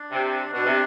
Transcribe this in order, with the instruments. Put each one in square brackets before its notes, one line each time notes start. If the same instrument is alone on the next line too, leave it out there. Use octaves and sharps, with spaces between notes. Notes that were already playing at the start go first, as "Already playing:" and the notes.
Already playing: [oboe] D4
[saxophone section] C3
[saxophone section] B2 [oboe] D4
[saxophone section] C3